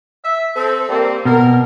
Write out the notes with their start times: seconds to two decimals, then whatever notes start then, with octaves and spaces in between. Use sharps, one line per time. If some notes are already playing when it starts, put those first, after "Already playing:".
0.23 E5
0.54 C4 A4
0.88 G3 A#3 C4
1.25 B2 A#4